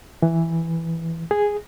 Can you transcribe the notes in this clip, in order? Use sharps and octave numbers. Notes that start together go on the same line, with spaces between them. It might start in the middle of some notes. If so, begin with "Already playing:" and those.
E3
G#4